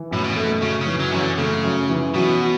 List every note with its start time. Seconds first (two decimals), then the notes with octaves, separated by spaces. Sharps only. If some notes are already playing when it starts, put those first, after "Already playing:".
Already playing: E3
0.11 F#2 A2
0.24 B2
0.36 A3
0.62 F#2 C#3
0.81 C#3
0.87 E3
1.00 F#3
1.11 F#2 C#3
1.19 D3
1.38 C#3 A3
1.64 F#2
1.89 E3
2.14 B2 F#3
2.40 F#4